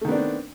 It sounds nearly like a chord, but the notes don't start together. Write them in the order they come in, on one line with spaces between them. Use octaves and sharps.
A3 D#3 B3 D4 C4